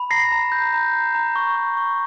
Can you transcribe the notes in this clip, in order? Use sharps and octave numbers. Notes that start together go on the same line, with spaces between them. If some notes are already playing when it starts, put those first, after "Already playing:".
Already playing: B5
A#5 A#6 C7
A#5
G6
A#5
A#5
A#5
C#6
C#6
C#6